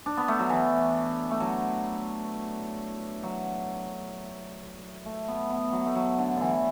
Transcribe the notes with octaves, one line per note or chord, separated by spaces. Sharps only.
D4
B3
A3
F#3
E3
A3
F#3
F#3
A3
B3
B3
F#3
A3
F#3
D3
D3 E3